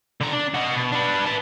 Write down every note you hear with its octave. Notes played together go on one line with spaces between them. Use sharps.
D3 A#5
D4
F#4 D#5
B2
D4 B4
B4 A5